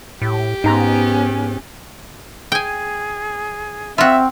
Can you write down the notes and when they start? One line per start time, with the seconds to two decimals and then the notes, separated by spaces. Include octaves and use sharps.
0.22 A2 G4
0.64 G#2 B3 C#4 D#4 A#5 C6
2.52 G#4 G5 G#5
3.98 C4 F4 F#4 E5